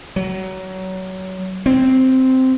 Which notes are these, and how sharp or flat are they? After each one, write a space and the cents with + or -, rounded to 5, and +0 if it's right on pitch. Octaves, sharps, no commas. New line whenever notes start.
F#3 +25
C4 -5